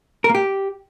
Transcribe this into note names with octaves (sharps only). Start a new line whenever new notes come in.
A#4
A#3
G4